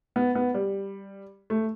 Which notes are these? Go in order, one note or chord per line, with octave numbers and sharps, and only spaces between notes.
B3
B3
G3
A3